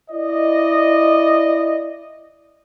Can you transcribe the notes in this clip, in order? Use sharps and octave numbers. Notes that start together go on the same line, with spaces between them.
E4 D5 D#5